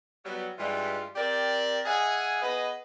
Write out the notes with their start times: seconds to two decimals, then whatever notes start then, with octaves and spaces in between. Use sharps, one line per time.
0.25 F#3 G3 B3
0.59 G2 E3 G3 G#3 F4 G4
1.16 C4 G4 A#4 D5
1.86 G#4 D#5 E5 F#5 G#5
2.42 B3 G#4 B4 D#5